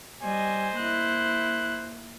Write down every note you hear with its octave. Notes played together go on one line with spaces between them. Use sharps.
G3 C5 D#5 G#5
A#3 E4 F#6